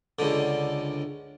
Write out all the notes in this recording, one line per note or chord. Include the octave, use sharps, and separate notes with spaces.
C#2 D3